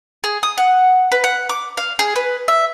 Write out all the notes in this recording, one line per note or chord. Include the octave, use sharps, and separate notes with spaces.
G#4
D#6
F#5
B4
F#5
D6
F5
G#4
B4
E5